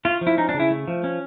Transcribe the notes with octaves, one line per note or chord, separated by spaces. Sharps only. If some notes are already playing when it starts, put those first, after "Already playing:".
A3 F4
F3
E4
C#4 D#4
D4
C#3
E4
A3
F3
C#4